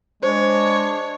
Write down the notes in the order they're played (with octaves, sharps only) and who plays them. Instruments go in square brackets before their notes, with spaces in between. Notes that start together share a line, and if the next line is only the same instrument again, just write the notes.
[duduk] G#3 [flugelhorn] D4 [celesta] C5 [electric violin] C#5